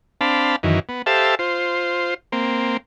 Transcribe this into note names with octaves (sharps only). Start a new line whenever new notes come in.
C4 D4 F5 A5 B5
F#2 D#3 E3
B3
G4 A4 C5 E5 F5 A5
F4 C5
A#3 C4